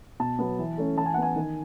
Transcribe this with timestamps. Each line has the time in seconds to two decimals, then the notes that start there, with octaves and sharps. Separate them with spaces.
0.20 B2 A5
0.39 F#3 B3
0.59 E3
0.78 A3 C#4
0.97 E3 A5
1.06 G#5
1.14 B3 F#5
1.22 G#5
1.36 D#3